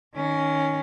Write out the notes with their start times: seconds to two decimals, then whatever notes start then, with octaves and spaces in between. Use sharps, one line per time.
0.15 D#3 C#4